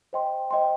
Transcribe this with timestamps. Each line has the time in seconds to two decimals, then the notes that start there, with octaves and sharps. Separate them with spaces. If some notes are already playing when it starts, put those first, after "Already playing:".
0.13 C5 D#5 G5 C6
0.51 C5 D#5 G5 C6